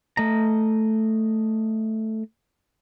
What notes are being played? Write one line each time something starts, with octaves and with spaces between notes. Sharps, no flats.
A3 D#5 A#5